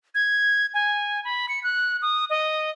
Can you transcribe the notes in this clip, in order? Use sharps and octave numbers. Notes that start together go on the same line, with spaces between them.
G#6
G#5
B5
C#7
F#6
D#6
D#5